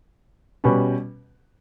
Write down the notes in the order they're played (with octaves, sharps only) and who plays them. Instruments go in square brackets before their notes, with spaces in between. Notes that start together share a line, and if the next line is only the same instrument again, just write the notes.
[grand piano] B2 G3 C#4 F#4 B4